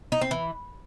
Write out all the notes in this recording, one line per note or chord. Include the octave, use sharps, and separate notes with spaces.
D#4
C4
E3